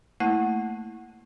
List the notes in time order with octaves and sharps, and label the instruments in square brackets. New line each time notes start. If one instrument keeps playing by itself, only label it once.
[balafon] A3 A#3 E4 F#5 A5